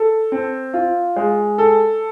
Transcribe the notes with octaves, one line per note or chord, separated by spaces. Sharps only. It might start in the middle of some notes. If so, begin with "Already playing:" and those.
Already playing: A4
C4
F4
G#3
A4